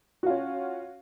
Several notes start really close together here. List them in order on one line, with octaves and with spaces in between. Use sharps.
F#4 F4 C#4